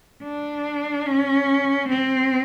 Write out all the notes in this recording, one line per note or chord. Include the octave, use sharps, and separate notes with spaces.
D4
C#4
C4